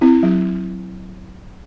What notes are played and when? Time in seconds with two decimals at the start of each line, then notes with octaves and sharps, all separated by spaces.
0.01 C4 E4
0.23 F#3